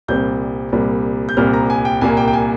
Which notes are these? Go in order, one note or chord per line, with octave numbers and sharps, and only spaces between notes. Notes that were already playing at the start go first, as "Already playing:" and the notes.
C2 A#2 G3 C4 G6
C2 A#2 G3 C4
G6
C2 A#2 G3 C4 F6
A#5
G#5
G5
C2 A#2 G3 A#3 G#5
G5
G5
G#5